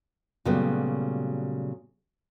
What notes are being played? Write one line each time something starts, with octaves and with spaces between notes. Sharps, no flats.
A#2 C#3 F#3 G3 A3 B3